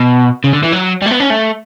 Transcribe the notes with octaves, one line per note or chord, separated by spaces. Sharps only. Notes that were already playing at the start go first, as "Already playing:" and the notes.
Already playing: B2
C#3
D3
E3
F#3
G3
A3
B3
C#4
A3